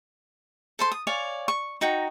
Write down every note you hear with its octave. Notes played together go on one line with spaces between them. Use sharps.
A4 C5 C6
D#6
C#5 D5 F5 G#5
C#6
D#4 F#4 G5 A#5